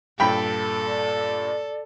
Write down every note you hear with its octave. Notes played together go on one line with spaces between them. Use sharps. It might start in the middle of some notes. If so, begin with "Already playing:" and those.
G2 A#2 A4 G5 B5
D5